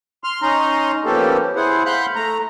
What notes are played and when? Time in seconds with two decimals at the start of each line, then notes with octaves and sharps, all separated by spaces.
0.24 C6 F6
0.42 C#4 D#4 A#5 C6
1.05 F3 A#3 B3 C#4 G4 A4
1.56 E4 G#4 C5 F#5
1.86 F5 F#5 B5 C6 F#6 G6
2.15 A3 A#5